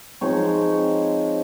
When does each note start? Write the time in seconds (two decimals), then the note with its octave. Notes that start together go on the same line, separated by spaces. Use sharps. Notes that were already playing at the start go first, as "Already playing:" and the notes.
0.21 F3 G#3 C4 D#4 C#5